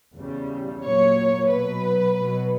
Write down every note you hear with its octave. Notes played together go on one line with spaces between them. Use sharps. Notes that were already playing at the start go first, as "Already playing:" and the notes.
E2 C#3 G3
A#2 F#3 C#5
B2 F#3 B4
B2 F#3